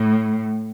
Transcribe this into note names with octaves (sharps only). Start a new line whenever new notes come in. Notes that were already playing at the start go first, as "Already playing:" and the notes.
Already playing: A2